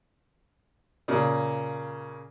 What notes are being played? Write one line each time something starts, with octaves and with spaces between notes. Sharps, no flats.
A#2 C#3